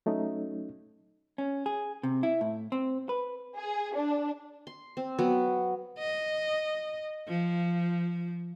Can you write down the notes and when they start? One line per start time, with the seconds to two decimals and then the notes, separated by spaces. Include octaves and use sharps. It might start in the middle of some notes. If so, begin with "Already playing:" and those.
0.06 F#3 A3 C#4 D#4
1.38 C#4
1.66 G#4
2.03 C3
2.23 E4
2.41 A2
2.72 C4
3.09 B4
3.56 G#4
3.95 D4
4.67 C6
4.97 C4
5.19 F#3 B3
5.99 D#5
7.28 F3